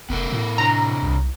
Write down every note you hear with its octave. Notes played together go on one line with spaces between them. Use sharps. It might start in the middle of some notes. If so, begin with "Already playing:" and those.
F1 B3 A4 A#4
A2
C3 D4 A#5
C2